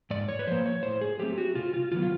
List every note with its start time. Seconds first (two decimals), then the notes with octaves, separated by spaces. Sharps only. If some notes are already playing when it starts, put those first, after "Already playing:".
0.11 G#2 D5
0.28 C#5
0.39 B4
0.47 F3 A#3 C5
0.66 C#5
0.83 A2 C5
1.01 G#4
1.19 F#3 A3 C4 G4
1.38 F#4
1.55 C3 F4
1.73 F4
1.92 D#3 F#3 B3 F4
2.02 F4